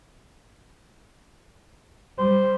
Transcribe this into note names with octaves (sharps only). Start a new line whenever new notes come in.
G3 C5